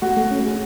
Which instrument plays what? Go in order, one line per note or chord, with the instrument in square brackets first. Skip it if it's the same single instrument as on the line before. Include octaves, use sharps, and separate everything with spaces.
[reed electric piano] A3 [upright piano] F#4
[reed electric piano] A3
C#4
G#4